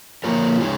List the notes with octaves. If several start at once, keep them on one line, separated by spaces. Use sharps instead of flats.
F3 A#3 F4 A#4 C#5
C#3 G#3 D#4 G#4 C#5